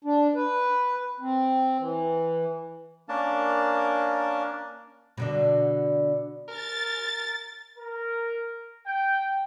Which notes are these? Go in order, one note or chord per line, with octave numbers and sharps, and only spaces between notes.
D4
B4
C4
E3
A#3 C#4 D4 A#4 A5
B2 D3 D4
A#4 A6
A#4
G5